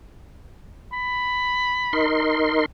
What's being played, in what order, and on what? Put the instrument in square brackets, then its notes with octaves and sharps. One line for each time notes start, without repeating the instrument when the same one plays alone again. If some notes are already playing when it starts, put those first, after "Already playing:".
[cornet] B5
[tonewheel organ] D#4 A#4 C6